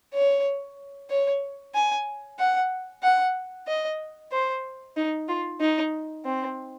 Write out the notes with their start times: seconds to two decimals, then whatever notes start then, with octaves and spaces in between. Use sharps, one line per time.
0.14 C#5
1.10 C#5
1.74 G#5
2.39 F#5
3.03 F#5
3.68 D#5
4.32 C5
4.97 D#4
5.28 F4
5.60 D#4
6.25 C4